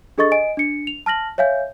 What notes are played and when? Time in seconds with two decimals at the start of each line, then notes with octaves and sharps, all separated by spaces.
0.18 D4 G#4 A4 D#5 C#6 A6
0.32 D#5 G#5 D7
0.57 D4 C#7
0.87 F7
1.06 A5 F6 A#6 F#7
1.38 C#5 E5 F5 G#5 G6